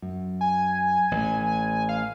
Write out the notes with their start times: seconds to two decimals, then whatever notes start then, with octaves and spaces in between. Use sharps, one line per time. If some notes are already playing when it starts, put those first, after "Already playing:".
0.02 F#2
0.41 G#5
1.11 A1
1.89 F5